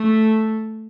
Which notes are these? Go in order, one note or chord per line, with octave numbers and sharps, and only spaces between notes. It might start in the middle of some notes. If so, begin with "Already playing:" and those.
Already playing: A3